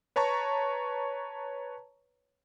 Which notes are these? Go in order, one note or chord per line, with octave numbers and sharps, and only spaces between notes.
B4 C#5 A5 A#5 C#6